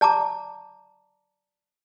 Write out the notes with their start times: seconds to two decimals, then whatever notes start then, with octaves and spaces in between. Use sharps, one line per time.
0.01 D5 A5 A#5 D6